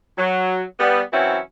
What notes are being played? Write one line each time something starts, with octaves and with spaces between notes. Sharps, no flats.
F#3
G3 B3
E3 F#3 C4 C#4 E4 F#4